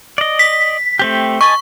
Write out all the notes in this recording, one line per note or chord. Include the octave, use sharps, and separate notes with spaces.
D5 D#5
B6
A3 C4 G4
D#5 G#5 A5 C#6